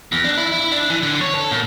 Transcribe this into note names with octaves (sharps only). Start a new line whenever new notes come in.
E2
D4
E4
E4
D4
E3
D3
C#5
A4
A#2